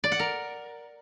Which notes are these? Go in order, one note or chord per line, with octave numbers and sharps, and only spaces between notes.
D5
F#5
A#4